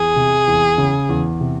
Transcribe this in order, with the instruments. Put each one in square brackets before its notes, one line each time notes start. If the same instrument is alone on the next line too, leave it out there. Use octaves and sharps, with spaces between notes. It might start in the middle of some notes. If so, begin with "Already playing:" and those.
Already playing: [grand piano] E2 [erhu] G#4
[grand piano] C3
E2
C#3
E2
C3